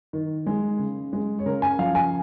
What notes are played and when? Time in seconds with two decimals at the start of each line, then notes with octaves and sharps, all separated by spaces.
0.13 D#3
0.47 G#3
0.79 C#3
1.13 G#3
1.39 C#5
1.46 C#3 A#4
1.62 G#5
1.79 F3 F5
1.95 G#5